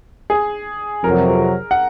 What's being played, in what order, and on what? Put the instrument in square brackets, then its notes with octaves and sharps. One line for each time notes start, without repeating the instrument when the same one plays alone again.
[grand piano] G#4
[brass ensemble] F2 C3 F#3 [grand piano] A#4
[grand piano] F#5